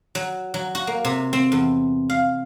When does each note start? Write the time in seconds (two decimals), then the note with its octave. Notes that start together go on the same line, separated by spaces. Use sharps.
0.15 F#3
0.54 F#3
0.75 F#4
0.87 A#3
1.05 C3
1.33 C4
1.52 E2
2.10 F5